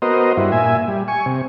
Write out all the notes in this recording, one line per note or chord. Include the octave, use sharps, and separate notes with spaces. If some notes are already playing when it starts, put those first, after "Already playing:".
B3 F#4 A#4 C5 D#5
G2 E4 F#4
A#2 E5 G#5
G3
G#5 C#6
C3